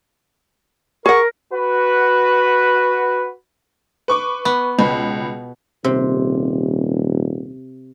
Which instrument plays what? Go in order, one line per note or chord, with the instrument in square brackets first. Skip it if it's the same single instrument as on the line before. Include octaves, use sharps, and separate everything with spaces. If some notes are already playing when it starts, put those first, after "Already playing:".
[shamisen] G#4 F#5 [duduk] A#4 [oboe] C#6
[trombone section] F#4 B4
[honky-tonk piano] B4 C#6 D6
[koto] B3
[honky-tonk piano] C#2 B5 [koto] B2
[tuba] D#1 [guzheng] C3